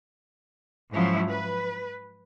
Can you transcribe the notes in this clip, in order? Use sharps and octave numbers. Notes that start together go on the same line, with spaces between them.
G#2 F3 F#3 C#4 E4
B4